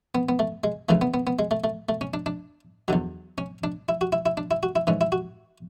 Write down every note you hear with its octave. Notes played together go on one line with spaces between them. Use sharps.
B3
B3
A3
G#3
D2 C#3 E3 A3
B3
B3
B3
G#3
A3
A3
A3
C#4
D4
D4
E2 D3 F#3
C#4
D4
E4
F#4
E4
E4
D4
E4
F#4
E4
G#2 E3 C#4
E4
F#4